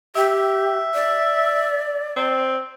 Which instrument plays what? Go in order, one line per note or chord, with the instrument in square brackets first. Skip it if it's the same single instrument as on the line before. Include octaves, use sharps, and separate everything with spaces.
[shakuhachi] G4 [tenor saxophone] E5
[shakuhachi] D5
[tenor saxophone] C4